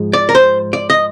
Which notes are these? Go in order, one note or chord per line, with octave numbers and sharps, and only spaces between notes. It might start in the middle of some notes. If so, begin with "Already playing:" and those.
Already playing: G#2 F3 G#3
D5
A#4
C5
D5
D#5